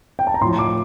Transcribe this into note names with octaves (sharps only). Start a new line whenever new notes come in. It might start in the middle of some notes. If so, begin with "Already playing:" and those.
G5
A5
A#5
A2 F3 C6
D6